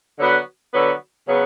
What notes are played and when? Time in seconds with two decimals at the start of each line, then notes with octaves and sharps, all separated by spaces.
0.19 D3 F#3 B3 F#4 B4
0.73 D3 F#3 B3 F#4 B4
1.27 C#3 F#3 B3